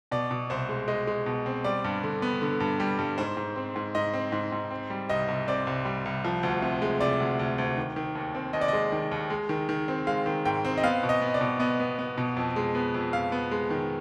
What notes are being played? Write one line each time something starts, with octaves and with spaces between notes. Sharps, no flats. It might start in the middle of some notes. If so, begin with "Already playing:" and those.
B2 D5
B2
C2 C5
G#3
G#3 D#5
G#3
B2
C4
G3 D5
G2
D3
B3
D3
G2
G3
G2
G#2 C5
G#2
C4
G#2
G#2 D#5
C4
G#2
G#2
C4
G3
C2 D#5
C2
C4 D5
C2
G3
C2
F3
D2
C3
G#3
C3 D5
D2
D2
D2
D#3
D#3
D#2
C4
D#2 D#5
D5
G#3 D#5
D#3
D#2
G#3
D#3
D#3
C4
G#3 F5
D#3
G#2 G5
C4
D#5
B3 F5
B2
D#5
B3
D5
B2
B3 D#5
B3
B3
B2
F2
G#3
B3
F2
F2 F5
B3
G#3
D#3